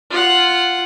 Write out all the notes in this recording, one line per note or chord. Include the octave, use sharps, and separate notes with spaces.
F4 F#5